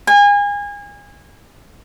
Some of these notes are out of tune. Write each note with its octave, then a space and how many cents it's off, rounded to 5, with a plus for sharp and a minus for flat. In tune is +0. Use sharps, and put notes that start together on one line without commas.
G#5 -30